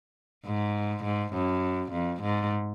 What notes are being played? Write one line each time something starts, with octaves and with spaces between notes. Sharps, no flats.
G#2
G#2
F#2
F2
G#2